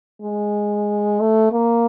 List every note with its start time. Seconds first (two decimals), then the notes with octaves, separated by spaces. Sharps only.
0.22 G#3
1.20 A3
1.53 A#3